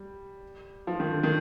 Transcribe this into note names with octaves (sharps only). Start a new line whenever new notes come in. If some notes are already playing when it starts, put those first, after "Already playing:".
Already playing: G3
F3
D#3
D3
D#3